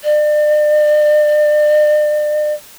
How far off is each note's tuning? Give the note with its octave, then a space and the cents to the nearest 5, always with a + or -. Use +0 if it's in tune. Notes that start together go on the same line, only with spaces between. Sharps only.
D5 +40